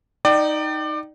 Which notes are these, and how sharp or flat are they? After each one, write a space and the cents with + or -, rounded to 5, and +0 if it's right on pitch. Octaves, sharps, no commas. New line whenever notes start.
D#4 +0 D5 +25 G5 -25